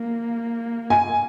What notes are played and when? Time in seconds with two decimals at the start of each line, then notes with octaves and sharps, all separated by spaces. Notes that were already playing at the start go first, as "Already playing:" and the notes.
Already playing: A#3
0.90 G#5